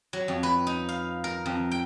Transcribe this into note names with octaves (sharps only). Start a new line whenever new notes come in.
F#3
F2
B4
D#4
F5
A#4
F2
G5